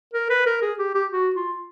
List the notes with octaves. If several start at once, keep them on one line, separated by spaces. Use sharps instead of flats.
A#4
B4
A#4
G#4
G4
G4
F#4
F4